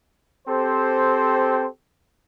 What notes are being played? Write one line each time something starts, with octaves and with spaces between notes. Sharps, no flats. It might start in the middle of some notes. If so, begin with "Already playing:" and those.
C4 G4 A4 C5